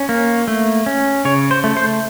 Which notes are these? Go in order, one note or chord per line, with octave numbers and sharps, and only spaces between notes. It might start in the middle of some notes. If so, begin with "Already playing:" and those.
Already playing: C#4
A#3
A3
C#4
C#3 C#5
C5
A3
C5